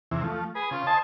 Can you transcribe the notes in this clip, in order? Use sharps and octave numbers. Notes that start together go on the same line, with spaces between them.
E2 C3 E3
F3 A3
G#4 B4
C#3 F4
C5 D#5 G#5 A5